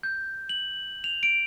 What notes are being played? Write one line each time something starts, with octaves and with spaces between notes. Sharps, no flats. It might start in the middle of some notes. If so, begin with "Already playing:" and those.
G6
F#7
F7
D7